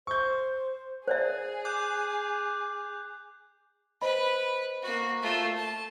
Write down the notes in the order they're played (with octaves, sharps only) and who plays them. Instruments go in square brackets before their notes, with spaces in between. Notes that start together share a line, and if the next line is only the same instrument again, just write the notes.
[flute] C5 [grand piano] C#6 G6
[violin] G#4 [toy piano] C5 D5 E5
[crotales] D6 F#6 G6
[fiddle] B4 [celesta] C5 D#5 B5
[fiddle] A#3 F#4
A3 F4
A5